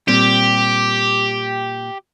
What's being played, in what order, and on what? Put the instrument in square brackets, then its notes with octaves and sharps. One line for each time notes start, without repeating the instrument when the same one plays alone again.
[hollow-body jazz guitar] A#2 G3 C4 [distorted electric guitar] G4